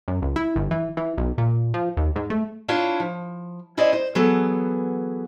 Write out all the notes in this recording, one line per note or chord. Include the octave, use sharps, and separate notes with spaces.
F#2
C#2
E4
G1
E3
E3
B1
A#2
F3
D#2
G#2
A3
D4 E4 F4 C#5
F3
C#4 E4 C5 D5 D#5
C5
E3 F#3 B3 G#4 A4